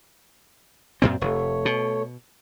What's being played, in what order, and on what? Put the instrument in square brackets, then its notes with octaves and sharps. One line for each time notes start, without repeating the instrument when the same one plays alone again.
[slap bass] F#2 A#2 C4
[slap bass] F1 [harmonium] A3 C#5
[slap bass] B2